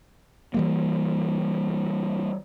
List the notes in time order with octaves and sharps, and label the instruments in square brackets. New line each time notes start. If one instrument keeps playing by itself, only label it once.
[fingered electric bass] E3 G3 A#3